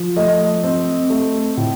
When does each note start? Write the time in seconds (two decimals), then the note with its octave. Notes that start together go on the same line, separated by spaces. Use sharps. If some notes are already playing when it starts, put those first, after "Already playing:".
Already playing: F3
0.16 A3 D#5
0.63 C4
1.10 A3
1.57 A2